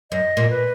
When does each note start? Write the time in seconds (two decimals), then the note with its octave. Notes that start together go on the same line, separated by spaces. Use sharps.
0.11 F#2 D#5
0.37 A#2
0.50 B4